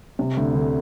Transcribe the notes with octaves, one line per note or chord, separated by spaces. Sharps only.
C3
D2
D2